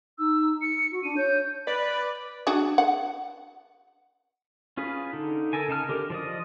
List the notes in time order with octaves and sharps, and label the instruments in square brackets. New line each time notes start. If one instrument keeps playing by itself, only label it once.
[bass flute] D#4 [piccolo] E6
[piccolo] C#7
[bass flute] F#4
[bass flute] D4 [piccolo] D#7
[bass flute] C#5 [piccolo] G6
[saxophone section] B4 [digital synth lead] D5
[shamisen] D4 F#4 G#4
F#5
[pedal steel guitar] C#4 F4 G#4 B4
D3 D#4
A4 A#4 G#5
C#3 D#4 A5 F6
D3 G4 A#4
F3 D5 D#5